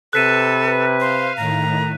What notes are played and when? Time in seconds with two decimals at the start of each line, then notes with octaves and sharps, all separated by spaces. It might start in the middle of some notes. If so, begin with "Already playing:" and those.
0.13 C3 A4 B4 F#6 B6 D#7
1.00 C5 F5
1.37 A2 D#3 A#5